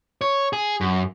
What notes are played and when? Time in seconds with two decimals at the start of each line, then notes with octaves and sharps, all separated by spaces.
0.21 C#5
0.53 G#4
0.81 F#2